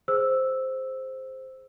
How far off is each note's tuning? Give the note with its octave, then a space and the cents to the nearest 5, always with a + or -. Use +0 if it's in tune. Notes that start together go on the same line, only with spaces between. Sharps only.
G#4 +0 C5 +0 E6 +0